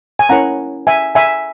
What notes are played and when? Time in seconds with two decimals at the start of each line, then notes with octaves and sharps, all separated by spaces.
0.19 G#5
0.29 C#4 E4 A#4 C#5 F#5 A#5
0.87 E5 G#5
1.15 E5 G#5